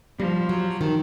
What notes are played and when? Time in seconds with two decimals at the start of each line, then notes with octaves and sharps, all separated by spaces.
0.19 F3 G3
0.49 F#3
0.81 D#3